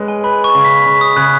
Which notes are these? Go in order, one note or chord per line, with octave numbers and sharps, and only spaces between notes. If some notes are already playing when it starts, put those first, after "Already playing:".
Already playing: G#3 C#4 B4
G#5
B4 B5
C#6
C#3
B6
C#3
D#6
C#3 F#6